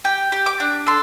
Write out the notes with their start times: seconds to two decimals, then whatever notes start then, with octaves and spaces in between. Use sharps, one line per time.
0.04 G4 G5
0.32 G4
0.46 D6
0.60 D4
0.87 A4 C6